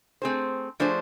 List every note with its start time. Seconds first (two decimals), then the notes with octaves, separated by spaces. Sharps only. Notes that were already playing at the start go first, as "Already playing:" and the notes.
0.22 A3 C4 G#4 C5
0.80 F3 A3 D4 G#4 C5